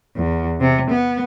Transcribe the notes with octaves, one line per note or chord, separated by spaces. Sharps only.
E2
C3
B3